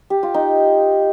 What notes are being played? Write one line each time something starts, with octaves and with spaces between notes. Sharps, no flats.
G4
F4
D#4